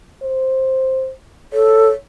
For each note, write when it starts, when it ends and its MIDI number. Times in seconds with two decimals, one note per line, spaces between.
0.23 1.12 72
1.53 1.88 69
1.53 1.96 73